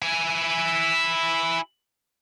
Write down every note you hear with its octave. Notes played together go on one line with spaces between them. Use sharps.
E4 G#5